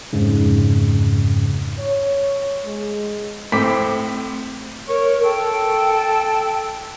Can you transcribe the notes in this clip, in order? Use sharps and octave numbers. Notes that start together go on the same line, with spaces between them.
F2 G#2 C#3
C#5
G#3
A2 C4 D6 B6
A#4 C#5
A4 G5